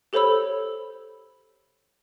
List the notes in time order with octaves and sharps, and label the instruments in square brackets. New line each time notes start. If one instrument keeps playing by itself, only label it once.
[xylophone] G4 A4 C5 C#5 B5 E6